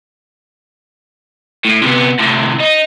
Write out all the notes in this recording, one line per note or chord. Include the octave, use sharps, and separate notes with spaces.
A2
C3 B3
A2 C3
D#4